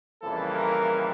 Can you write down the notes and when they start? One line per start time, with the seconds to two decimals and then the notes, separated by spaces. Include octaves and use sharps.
0.22 F2 C#3 E3 G3 A#3 A4
0.56 A#4